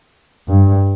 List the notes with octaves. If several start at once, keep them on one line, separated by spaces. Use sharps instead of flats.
G2